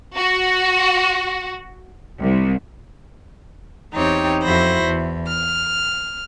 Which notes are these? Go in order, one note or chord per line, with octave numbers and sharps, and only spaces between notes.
F#4
C2
E2 C4 D#4 G4 C#5
F2 E4 F#4 C5 B5 A#6
E2
F6